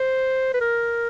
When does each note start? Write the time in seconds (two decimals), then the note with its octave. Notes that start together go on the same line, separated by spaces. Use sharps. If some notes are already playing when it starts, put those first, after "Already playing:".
Already playing: C5
0.54 B4
0.61 A#4